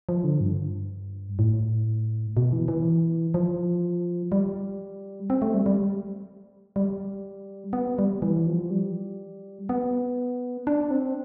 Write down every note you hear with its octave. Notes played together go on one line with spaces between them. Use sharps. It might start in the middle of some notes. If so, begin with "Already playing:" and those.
F3
D3
G2
A2
B2
E3
E3
F3
G3
C4
A3
G3
G3
G3
B3
G3
E3
F3
G3
B3
D4
C4